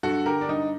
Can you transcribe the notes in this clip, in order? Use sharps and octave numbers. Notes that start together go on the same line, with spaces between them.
G2 F#4 A4
D3 G4 A#4
D4
G2 D#4